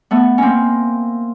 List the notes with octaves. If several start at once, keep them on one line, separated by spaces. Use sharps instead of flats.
A3 B3
A#3 C4 C#4